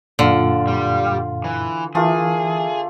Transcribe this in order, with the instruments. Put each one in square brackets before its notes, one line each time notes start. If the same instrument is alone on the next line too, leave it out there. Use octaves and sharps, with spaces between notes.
[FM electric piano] F#2 A#2 [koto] D3 [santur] F4 F5
[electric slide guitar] G3
E3
[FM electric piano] E3 [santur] A3 A#3 F4 [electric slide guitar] G#4